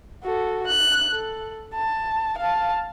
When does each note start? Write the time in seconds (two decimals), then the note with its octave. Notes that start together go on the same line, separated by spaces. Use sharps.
0.24 F#4 A4
0.67 F#6
1.11 A4
1.74 A5
2.38 F5 A5